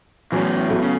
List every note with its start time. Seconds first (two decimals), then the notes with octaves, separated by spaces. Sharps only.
0.32 E2 A2 E3 F#3 C#4
0.69 F#3 A3 B3
0.82 C#3